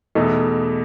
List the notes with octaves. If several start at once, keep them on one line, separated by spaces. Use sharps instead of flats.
E2 B2 A3 D#4